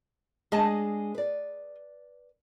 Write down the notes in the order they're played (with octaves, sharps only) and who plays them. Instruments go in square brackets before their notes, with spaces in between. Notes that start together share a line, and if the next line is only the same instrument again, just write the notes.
[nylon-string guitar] G#3 D4 [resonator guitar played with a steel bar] G#4 D#5 A5
[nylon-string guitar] B4 D5